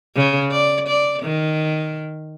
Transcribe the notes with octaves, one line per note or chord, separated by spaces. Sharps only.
C#3
D5
D5
D#3